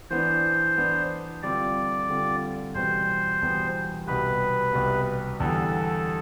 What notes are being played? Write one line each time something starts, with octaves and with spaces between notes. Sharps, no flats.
E3 B3 D4 C5
E3 B3 D4
D3 G3 C4 F4 D5
D3 G3 C4 F4
E2 B2 G3 B3 C5
E2 B2 G3 B3
C2 B2 G3 B3 B4
C2 B2 G3 B3
E2 D3 G3 A4